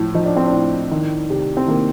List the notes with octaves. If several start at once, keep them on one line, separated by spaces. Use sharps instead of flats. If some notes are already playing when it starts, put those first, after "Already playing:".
Already playing: A2 F3
F3 D#4
D4
C4
A2 D4
D#3
C3
C4
D#3 A#3